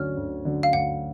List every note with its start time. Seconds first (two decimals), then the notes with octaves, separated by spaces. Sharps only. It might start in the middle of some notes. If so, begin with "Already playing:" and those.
Already playing: D2 D3 F#3 C#4 F6
0.17 D2
0.45 D3 F#3 C#4
0.63 F5
0.73 D2 F#5